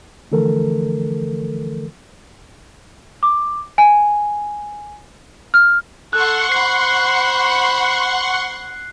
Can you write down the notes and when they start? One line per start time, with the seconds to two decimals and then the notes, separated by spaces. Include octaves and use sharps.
0.32 D3 E3 F3 A3 A4 A#4
3.23 D6
3.78 G#5
5.54 F6
6.13 A4 F#5 C6 C#6 F#6
6.52 C5 B5 C7